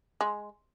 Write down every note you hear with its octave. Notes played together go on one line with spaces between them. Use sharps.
G#3